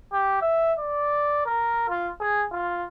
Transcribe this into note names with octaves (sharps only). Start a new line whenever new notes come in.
G4
E5
D5
A#4
F4
G#4
F4